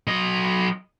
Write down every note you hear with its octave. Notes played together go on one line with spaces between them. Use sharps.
F#3 D#5